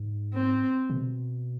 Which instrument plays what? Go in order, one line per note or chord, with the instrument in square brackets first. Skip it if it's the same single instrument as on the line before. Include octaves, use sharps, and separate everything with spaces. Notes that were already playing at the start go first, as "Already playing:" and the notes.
Already playing: [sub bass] G#2
[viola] C4
[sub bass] B2